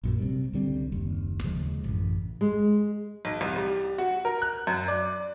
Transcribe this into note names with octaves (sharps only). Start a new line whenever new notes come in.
A#1 F#2 A#2
C3 G3
C#2 D3 G3 C4
F#1 D#2
D#2 C#3 F3 G#3
A1 F#2
G#3
B1
C2
G3
F#4
A#4
F#6
F#2
D5